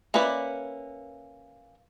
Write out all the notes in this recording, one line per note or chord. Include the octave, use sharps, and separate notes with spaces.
A#3 C#4 E4 B4 D5